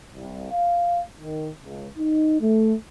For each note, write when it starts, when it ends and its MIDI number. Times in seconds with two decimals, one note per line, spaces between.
0.15 0.50 36
0.52 1.00 77
1.20 1.49 51
1.63 1.87 37
1.97 2.36 63
2.40 2.74 57